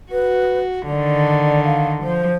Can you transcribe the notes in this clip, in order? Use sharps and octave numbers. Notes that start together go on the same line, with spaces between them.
F#4 B4
D3 D#3 D5
F5
F3 C5